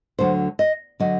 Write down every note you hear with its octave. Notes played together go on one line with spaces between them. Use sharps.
D2 D3 F#3 C5
D#5
D3 F#3 D#5